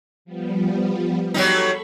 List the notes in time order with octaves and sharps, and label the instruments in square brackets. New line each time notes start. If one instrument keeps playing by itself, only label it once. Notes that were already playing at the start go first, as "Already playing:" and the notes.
[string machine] F3 G3 B3
[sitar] F#3 G3 D#4 [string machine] A4 B5 C#6